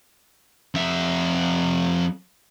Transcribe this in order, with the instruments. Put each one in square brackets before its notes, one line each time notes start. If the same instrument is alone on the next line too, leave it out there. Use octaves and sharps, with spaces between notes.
[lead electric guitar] F2 E5